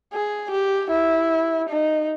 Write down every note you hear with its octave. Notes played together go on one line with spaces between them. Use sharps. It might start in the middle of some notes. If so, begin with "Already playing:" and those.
G#4
G4
E4
D#4